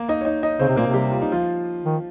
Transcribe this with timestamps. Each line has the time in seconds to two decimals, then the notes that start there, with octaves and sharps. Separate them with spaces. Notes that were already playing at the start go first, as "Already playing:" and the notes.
Already playing: A#3 A#4
0.09 D#4 D#5
0.21 C#5
0.25 D#4 D#5
0.43 D#4 D#5
0.59 C#3 C4 C5
0.69 C3
0.76 A#2 A#3 A#4
0.86 C3
0.94 G3 G4
1.11 F4
1.22 D#4
1.32 F3 F4
1.85 D#3